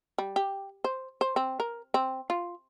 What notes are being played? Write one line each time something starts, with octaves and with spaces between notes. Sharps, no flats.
G3
G4
C5
C5
C4
A#4
C4
F4